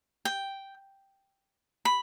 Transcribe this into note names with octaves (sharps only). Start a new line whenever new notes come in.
G5
B5